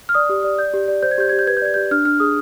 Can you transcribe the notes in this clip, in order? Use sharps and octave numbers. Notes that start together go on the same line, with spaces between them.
F6
D5 D#6
G4
D5
D5 G6
G4
D5
C5 G6
G#6
G4 G6
G4 G#6
G6
B4 G#6
G6
D5 G#6
G4 G6
D4 F6
D4 F6
G#4 D#6